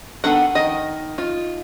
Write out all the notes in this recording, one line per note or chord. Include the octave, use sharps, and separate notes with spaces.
D#3 B3 D4 A4 F#5
D#3 D#5
D#4 F4